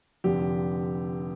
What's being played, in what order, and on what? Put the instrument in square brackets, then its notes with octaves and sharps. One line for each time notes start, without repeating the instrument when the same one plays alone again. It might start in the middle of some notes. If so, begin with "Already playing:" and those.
[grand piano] F1 F2 D3 G4